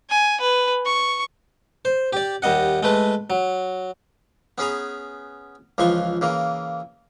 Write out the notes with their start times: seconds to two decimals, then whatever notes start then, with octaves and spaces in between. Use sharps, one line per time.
0.10 G#5
0.41 B4
0.86 C#6
1.85 C5
2.13 G4 D5
2.42 D#2 G3 D#5 F#5
2.83 G#3 A3 B4
3.30 F#3
4.58 B3 C#4 G#4 B4 A#5
5.78 C#2 E3 F3 B4 C6 C#6
6.21 C#3 E3 A#3